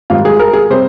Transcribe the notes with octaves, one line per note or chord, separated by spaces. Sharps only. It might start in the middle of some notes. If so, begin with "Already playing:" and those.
G#2 D#3 G3 F4
G#4
A#4
G#4
C3 G3 C5